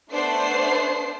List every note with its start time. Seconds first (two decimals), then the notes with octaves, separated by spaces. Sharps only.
0.10 A3 B3 D4 C5 C7